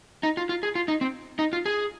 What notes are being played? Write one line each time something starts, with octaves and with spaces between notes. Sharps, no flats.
D#4
F4
F4
G#4
F4
D#4
C4
D#4
F4
G#4